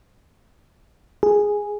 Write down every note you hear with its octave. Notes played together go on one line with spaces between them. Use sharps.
G#4